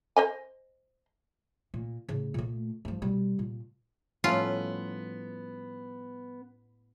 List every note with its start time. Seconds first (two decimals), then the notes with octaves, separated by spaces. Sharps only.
0.16 C5 D#5 G#5
1.74 A#2
2.09 A2 C#3
2.34 A#2 A3
2.85 G2 F3
3.02 B2 G3
3.39 A#2
4.24 A2 F3 G3 A3 B3 C#4 F4